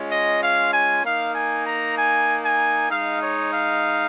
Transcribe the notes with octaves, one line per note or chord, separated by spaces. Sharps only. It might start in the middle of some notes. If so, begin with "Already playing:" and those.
Already playing: G#3 C#4 F4
D#5
F5
G#5
A#3 D#4 F5
G#5
A#5
G#5
G#5
G#3 D#4 F5
C#5
F5